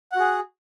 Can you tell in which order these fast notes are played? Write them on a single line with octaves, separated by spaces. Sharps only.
F#5 F#4 G#4